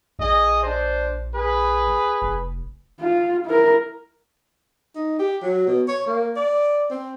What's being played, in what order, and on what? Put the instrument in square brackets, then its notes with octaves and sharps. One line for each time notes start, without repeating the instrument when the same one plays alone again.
[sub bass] A#1 [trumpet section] G#4 D#5
[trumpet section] D4 C5
G#4 B4
[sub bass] F1
[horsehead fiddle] F4
E4 A#4
[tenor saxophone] D#4
G4
F#3
B2
C#5
A#3
D5
C4